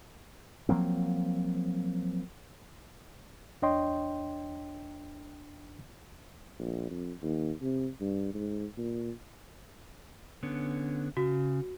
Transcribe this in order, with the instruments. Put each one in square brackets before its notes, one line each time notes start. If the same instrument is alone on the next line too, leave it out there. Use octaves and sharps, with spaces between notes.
[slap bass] F3 F#3 A#3 C4
[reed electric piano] E2 D4 C#5 D#5 G5 C6
[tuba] A#1
F2
D#2
C3
G2
G#2
A#2
[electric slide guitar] D3 B3 C#4
[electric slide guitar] C#3 [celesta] F#4